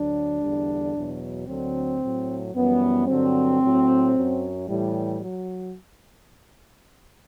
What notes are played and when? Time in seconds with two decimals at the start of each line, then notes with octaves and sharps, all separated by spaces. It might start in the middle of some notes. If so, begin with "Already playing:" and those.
Already playing: D2 D3 F#3 D4
0.41 E2 D3 G3
0.94 E2 B2 F#3
1.48 D2 D3 F#3 C4
2.01 A2 F#3
2.55 F#2 E3 G3 B3
3.08 G2 D3 F#3 C4
3.61 A2 F#3
4.15 F#2 F#3
4.69 A2 E3 G3
5.22 F#3